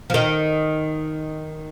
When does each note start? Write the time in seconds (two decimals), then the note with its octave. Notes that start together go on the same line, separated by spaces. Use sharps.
0.10 F3
0.14 D#3